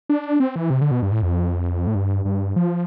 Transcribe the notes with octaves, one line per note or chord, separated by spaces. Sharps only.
D4
C4
E3
C3
D3
B2
G2
A2
F2
A2
G2
G2
F3